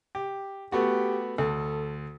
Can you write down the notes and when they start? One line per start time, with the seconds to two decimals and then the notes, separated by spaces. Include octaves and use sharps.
0.15 G4
0.72 A3 B3 F#4 G4
1.38 D2 A4